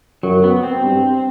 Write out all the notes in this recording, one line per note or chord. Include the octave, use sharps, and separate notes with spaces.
F#2 F#3
B3
C4
G2